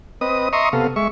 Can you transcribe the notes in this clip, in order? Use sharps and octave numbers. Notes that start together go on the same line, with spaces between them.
C4 B4 D#5 D#6
D#5 E5 A#5 C6 C#6 D#6
C3 B3 A4 F5
G#3 E5 C#6